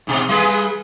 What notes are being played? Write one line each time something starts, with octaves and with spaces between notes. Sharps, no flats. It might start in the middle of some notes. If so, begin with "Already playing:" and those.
G#2 B2 C4
G3 G#4 B4